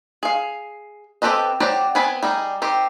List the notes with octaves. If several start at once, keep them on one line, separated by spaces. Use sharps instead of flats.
G#4 F5
C4 G4 A4 B4 D#5
F#3 C4 F#4 G4 D5
B3 C4 B4 G#5 B5
G3 D#4 G#4
D#3 C4 G4